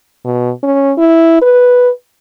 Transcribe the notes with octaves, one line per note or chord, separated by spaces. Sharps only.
B2
C#4
E4
B4